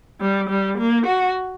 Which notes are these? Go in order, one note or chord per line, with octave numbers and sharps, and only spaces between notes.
G3
G3
A#3
F#4